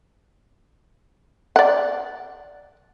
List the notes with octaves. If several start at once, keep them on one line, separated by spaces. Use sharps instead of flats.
D5 F#5